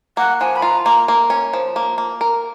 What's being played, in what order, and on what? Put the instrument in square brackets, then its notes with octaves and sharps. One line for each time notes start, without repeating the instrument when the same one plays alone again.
[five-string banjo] A#3 [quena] F#5
[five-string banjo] F3 [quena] G#5
[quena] B5
[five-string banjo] F4 [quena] A#5
[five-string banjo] A#3 [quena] A#5
[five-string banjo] A#3
C#4
F3
A#3
A#3
A#4